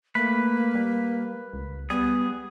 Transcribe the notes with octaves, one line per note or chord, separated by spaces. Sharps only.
A3 A#3 B4
G3
C#2
G3 B3 G#4